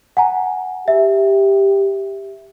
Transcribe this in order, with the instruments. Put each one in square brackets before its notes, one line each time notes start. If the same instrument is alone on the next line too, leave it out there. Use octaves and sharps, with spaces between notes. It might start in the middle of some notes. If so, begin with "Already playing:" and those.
[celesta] F#5 G#5 A#5
[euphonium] G4 [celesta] E5